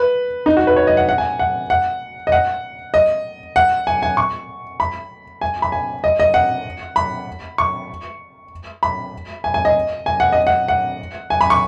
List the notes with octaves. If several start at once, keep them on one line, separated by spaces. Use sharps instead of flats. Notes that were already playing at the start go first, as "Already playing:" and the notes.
Already playing: B4
D#4
F#4
B4
C#5
D#5
F#5
F#5
G#5
F#5
F#5
D#5
F#5
D#5
F#5
G#5
G#5
C#6
B5
G#5
B5
G#5
D#5
D#5
F#5
B5
C#6
B5
G#5
G#5
D#5
G#5
F#5
D#5
F#5
F#5
G#5
B5
C#6